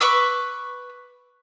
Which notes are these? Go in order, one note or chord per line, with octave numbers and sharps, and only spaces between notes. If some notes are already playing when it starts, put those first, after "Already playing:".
B4 C#6 D6 E6